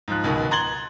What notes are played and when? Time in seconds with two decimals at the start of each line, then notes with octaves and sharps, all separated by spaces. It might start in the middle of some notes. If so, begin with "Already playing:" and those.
0.08 G#2 F3 F#6
0.24 C#2 B2 D#3
0.51 A#5 C6 G#6 A6 F#7 G7